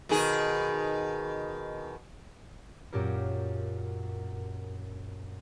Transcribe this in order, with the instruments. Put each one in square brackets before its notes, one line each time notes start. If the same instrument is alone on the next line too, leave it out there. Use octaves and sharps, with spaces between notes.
[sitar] B2 D#3 G#4
[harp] F#2 A#2 C#4 G4 A#4